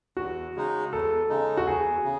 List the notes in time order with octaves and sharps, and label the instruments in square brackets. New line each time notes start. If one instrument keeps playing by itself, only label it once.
[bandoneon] E2 [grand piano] F#4
[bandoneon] C#3 G#3 D#4
[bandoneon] E2 [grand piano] A4
[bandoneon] C#3 G#3 D#4
[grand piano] F#4
[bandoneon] E2 [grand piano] G#4
[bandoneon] C#3